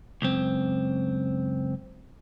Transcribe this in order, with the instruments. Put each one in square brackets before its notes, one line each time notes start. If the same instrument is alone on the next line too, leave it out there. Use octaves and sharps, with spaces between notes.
[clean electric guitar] C#2 F#2 C4